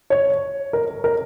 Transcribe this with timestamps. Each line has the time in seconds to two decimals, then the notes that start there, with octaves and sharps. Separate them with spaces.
0.10 C#5
0.73 A#4
1.04 A#4